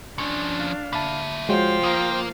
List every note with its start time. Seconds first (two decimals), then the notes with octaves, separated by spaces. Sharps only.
0.18 F3 C#4 D4 C#6
0.60 F5
0.93 A#3 E5 A5 B5
1.49 F3 G#3 F#4 C5 C#5 F5 G5
1.83 A#3 A#4 D#6